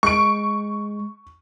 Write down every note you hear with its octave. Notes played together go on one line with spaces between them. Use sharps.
G#3 C#6 D7